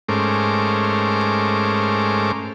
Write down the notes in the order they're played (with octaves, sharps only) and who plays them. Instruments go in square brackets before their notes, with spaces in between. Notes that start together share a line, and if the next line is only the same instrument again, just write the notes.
[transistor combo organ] G#2 A3 C#4 A#4 C5 D6